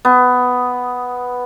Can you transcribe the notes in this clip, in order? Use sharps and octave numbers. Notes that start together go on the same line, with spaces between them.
B3